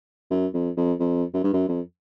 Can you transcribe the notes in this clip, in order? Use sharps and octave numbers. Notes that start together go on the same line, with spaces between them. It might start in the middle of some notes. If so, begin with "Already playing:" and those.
F#2
F2
F2
F2
F#2
G2
F#2
F2